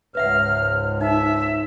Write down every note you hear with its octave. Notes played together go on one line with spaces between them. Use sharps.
C#2 G#2 B4 E5 F#5 F6
D#4 E5